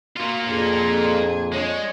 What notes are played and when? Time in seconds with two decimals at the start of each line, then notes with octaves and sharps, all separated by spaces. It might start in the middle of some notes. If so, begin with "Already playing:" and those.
0.17 A#3 F4 F#4 F5
0.46 F2 A#2 D4 G#4
1.53 G#3 D4 C#5